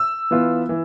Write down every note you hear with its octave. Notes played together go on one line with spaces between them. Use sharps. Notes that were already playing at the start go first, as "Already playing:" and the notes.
Already playing: E6
E3 B3 F4
E3